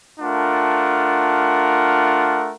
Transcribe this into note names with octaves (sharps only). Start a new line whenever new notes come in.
A3 D4 F4 A#4 F#5